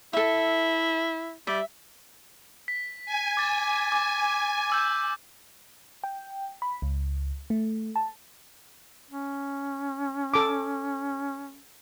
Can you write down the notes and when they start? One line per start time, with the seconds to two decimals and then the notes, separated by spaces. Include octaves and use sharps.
0.13 E4 A4 E5
1.47 G3 E5
2.68 B6
3.06 G#5
3.37 D6 A6
3.92 D6
4.70 D6 E6 G6
6.04 G5
6.62 B5
6.82 C#2
7.50 A3
7.96 A5
9.11 C#4
10.34 A4 D6